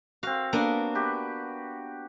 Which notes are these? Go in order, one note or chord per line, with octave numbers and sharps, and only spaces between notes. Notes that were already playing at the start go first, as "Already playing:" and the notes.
C4 F#4 F5
A#3 B3 D4
F#4 G4 B4